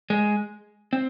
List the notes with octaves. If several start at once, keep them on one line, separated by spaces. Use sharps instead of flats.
G#3
C4